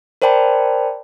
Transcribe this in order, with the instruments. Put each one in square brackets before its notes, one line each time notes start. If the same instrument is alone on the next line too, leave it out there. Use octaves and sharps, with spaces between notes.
[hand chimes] A#4 C5 D5 G5 A5 B5